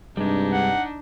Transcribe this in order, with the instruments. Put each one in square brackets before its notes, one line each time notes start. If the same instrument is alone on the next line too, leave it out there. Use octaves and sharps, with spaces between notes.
[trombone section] G2 C3 [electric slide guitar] G3 G#3 [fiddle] D4 D#4
[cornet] F#5